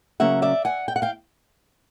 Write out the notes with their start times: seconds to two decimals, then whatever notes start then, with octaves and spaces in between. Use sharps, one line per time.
0.20 C#3 F#3 A#3 C#4 E5 F#5
0.42 D5 E5
0.65 F#5 G#5
0.88 G5
0.96 F#5
1.02 F5 G5